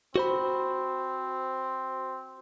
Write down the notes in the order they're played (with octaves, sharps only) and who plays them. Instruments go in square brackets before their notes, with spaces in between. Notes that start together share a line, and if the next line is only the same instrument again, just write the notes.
[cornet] C4 [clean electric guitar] F#4 C5 B5